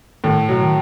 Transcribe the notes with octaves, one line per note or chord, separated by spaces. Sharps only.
A2 D#3
B2 F#3
D#3